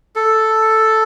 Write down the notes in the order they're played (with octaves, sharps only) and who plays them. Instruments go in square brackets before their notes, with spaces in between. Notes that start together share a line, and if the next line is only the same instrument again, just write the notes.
[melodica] A4